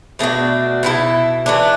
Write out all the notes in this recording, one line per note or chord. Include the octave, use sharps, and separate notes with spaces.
B2 A3 D4 F#4
B2 B3 E4 A4
E3 A3 D4